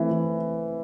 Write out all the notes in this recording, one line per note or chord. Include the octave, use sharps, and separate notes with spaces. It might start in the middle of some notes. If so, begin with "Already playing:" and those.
Already playing: E3 A3 C4
E3